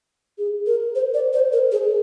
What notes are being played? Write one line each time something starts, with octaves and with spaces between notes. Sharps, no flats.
G#4
A#4
C5
D5
C5
A#4
G#4